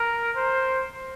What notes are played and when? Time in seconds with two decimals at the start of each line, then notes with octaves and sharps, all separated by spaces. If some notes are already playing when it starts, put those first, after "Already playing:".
Already playing: A#4
0.37 C5